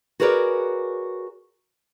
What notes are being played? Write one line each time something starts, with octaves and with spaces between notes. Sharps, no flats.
F#4 G#4 A#4 B4 C#5 D5